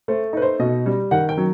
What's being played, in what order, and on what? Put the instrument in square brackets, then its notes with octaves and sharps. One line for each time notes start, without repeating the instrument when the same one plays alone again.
[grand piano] A3 C5
D#4 B4
C5
B2 D#5
G3
D#3 F#5
G5
F#3